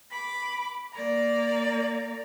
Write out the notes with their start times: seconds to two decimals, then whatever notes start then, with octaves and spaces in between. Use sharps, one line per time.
0.11 B5 D6
0.93 A#3 D5 A#5